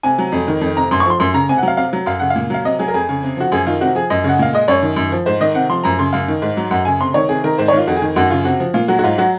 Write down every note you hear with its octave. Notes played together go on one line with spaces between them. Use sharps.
C3 G#5
F#3
F2
D#3
F2
C3 A#5
F#2 C6
C#6
F3 C6
F#2 C6
C#3 A#5
C3 G#5
F#5
F#3 F5
C3 F5
F#3
F#2 F5
C#3 F#5
F5
A#2
F#3 F5
C3 D#5
F#3 G#4
A#4
F2 G#4
C#3
C3
F3 F#4
F#2 G#4
D#3 F4
C3 F#4
F3 G#4
F#2 D#5
C#3 F#5
A#2 F5
G#3 D#5
F#2 C#5
D#3
F#2
F3
G#2 C5
D#3 D#5
C3 F#5
F3 C6
F#2 A#5
C#3 C6
F#2 F5
D#3
G#2
F#3
F#2 F#5
C#3 G#5
C3 C6
D#3 C#5
C3 G#4
D#3 A#4
G#2 C5
C#5
D#3 F4
F2 F#4
G#4
D#3
F#2 F#4
C#3 F4
C3 F#4
F3
A#2 F4
F#3 F#4
F#4
G#2 F4
F#3 F#4